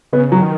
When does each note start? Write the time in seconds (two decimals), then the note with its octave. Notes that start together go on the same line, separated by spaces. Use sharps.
0.13 C#3 B3
0.32 F#3
0.41 D#3